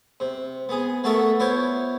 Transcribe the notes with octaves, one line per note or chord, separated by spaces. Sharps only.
C3
B3 G#4
A3 B3 F#4 A4 A#4 E5
B3 E4 F4 C5 C#5